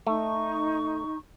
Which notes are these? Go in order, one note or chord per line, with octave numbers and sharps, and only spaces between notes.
A3 D#4 C#6